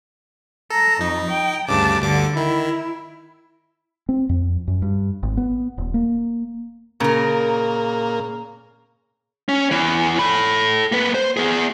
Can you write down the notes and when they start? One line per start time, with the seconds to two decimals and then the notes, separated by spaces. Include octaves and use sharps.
0.70 A4 A#5
1.01 F2 D#4
1.31 G5
1.68 D2 G2 C#3 A5 D6
2.02 D2 G2 D3 D6
2.37 D#3 E4
4.09 C4
4.29 F2
4.68 F#2
4.82 G2
5.23 G#1
5.37 B3
5.78 D#1
5.94 A#3
7.00 A#2 C#3 A#3 A#4
9.49 C#4
9.71 E2 E3
10.19 A4 B5
10.92 A#3 B4
11.14 C5
11.37 B3 G#4